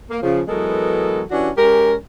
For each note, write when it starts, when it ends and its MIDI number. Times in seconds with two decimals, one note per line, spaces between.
0.09 0.17 58
0.22 0.41 49
0.22 0.41 53
0.48 1.22 52
0.48 1.22 54
0.48 1.22 56
0.48 1.22 59
0.48 1.22 69
0.48 1.22 70
1.31 1.50 52
1.31 1.50 61
1.31 1.50 62
1.31 1.50 64
1.31 1.50 66
1.31 1.50 67
1.57 1.94 56
1.57 1.94 61
1.57 1.94 67
1.57 1.94 70